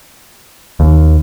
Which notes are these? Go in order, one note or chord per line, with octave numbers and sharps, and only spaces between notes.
D#2